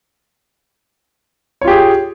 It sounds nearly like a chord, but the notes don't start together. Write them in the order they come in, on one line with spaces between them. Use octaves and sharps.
C#5 F4 G4 G#4